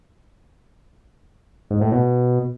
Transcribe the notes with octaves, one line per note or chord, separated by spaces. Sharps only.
G#2
A2
B2